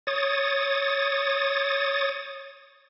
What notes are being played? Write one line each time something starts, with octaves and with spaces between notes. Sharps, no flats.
C#5 D#6 A6